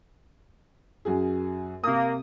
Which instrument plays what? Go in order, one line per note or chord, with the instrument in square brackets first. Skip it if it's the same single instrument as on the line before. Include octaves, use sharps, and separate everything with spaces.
[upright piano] F#2 F#4 G#4
[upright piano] C3 D#6 [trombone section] A#3